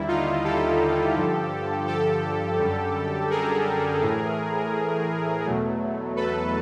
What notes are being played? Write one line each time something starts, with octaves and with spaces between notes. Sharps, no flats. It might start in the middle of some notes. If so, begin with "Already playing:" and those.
Already playing: D#2 D3 G3 E4
D#4 F4
G4 A4
G2 D3 F3
G4 A4
F#2 D3 G3
G#4 A#4
A2 E3 A3
E2 B2 F#3 A3
A4 B4